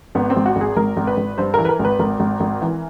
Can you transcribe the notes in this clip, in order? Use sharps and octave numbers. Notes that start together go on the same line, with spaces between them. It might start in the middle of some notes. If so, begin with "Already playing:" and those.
G#1 B3
C4
G#1
F#4
G#1
G#4
G#1 A#4
G#1
B4
G#1
G2 C5
E3 A#4
B4
A#4
G#1
B4
G#1 A#4
G#1
G#1
E3